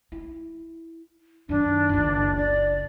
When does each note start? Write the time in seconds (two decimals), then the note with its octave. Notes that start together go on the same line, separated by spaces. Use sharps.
0.12 E4
1.49 F#2 D#3 D4
1.89 F#1 C#2
2.37 D5